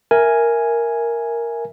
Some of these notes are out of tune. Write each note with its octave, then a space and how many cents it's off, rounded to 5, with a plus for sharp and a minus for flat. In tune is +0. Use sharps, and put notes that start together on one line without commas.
A#4 +0 E5 +0 G#5 +0